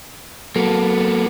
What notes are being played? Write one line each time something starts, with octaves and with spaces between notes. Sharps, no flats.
F#3 A#3 B3 A4